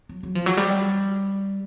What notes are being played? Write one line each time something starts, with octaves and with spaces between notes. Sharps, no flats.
F#3
F#3
F3
F#3
G3